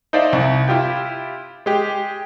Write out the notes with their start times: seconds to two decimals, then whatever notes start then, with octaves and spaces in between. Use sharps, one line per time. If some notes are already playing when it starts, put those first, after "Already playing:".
0.13 D#4 C5 D5 E5 F5
0.33 C2
0.68 E4 F4 G4 G5
1.66 G#3 G4